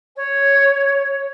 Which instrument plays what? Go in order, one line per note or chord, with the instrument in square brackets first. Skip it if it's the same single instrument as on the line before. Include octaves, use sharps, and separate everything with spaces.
[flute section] C#5